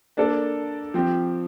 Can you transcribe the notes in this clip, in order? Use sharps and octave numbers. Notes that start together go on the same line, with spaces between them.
A#3 D4 A4 D5
F3 C4 G4